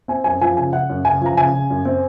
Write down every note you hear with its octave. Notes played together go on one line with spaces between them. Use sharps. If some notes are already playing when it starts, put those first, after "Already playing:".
C4 G#5
F#2 G#5
F3 G#5
C#3 G#5
C#3 F#5
F#2
C#3 G#5
F3 A#5
C#3 G#5
C#3
F#2
C4